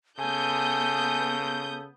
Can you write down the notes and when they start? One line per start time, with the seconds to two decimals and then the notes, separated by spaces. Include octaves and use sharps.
0.19 C#3 B3 A4 G#5 D#6 G6